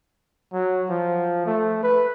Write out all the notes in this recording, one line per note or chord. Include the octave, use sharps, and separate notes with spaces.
F#3
F3
A3
B4